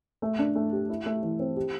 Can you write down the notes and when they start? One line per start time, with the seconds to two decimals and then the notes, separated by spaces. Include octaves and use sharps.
0.22 A3
0.39 D4
0.55 A3
0.72 G4
0.89 E4
1.06 A3
1.23 E3
1.39 C4
1.57 G4